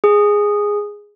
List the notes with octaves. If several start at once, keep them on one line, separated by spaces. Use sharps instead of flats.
G#4